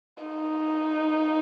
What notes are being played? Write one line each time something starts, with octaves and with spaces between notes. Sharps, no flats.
D#4